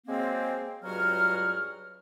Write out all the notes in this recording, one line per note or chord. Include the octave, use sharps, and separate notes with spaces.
F#3 G#3 A#3 C4
C#2 G2 F#3 F#4 F6